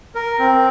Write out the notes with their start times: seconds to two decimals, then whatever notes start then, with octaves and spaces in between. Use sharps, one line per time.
0.15 A#4
0.39 C4